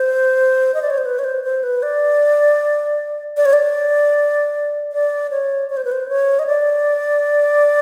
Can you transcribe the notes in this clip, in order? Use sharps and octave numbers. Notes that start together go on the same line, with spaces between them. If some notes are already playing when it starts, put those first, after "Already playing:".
Already playing: C5
D#5
D5
C#5
C5
B4
C#5
C5
C5
B4
D5
D5
C#5
D5
D5
C#5
C#5
C5
B4
C5
C#5
D#5
D5